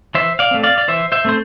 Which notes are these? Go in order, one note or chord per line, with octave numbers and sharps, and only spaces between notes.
E3 C5 E5
D5 F5
A3 C4
D5 F5
D5
E3 C5 E5
C5 E5
A3 C4 C5